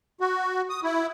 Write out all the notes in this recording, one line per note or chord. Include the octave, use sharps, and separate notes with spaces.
F#4
D#6
E4